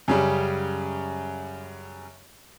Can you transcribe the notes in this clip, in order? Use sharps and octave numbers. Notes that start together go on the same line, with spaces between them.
F#2 C#3 G3